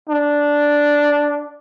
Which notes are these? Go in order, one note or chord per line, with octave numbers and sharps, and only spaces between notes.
D4